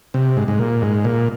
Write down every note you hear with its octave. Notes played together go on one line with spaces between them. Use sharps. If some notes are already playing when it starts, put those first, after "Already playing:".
C3
G#2
G#2
A#2
G#2
A#2